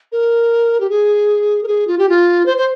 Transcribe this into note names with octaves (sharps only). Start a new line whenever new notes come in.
A#4
G4
G#4
A#4
G#4
F4
G4
F4
C5
C5